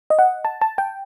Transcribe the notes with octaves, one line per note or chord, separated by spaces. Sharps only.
D#5
F#5
A5
A5
G5